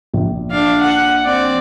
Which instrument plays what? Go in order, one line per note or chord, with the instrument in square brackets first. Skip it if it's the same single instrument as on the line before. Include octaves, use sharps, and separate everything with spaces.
[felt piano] A#1
[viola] D4 F5
F#5
C4 D5